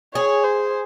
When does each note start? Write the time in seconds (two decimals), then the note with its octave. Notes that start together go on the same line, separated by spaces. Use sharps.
0.15 G#4 C#5
0.44 C5